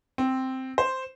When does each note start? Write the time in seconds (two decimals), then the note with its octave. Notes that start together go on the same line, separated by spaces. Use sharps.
0.18 C4
0.78 C5